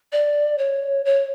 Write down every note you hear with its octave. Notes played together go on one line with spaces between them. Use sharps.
D5
C#5
C#5